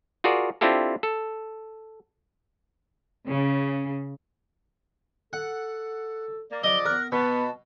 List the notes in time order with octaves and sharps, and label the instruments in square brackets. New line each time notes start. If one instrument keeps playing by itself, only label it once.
[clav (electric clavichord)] F4 F#4 G#4 A#4 D5
C4 D4 E4 F4 G4 A4
A4
[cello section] C#3
[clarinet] A4 [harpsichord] F#5
[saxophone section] A#3 [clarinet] D5
[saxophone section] C#3 F3 D5 [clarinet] F#3 [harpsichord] D#5 [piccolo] G7
[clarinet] B3 [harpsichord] A#4 [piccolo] F#6
[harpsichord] B2 [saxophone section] B3 [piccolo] A5 [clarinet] B5